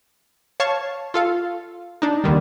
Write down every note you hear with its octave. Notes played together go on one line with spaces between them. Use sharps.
C#5 F5 A5 C#6
F4 A4 F5
D4 D#4
D#2 D3 D#3 G3